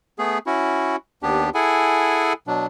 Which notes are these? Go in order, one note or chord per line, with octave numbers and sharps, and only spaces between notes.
A3 B3 G#4
C#4 E4 F#4
D#2 B3 D4 G4
E4 G#4 A4 F#5 G#5
B2 F#3 D4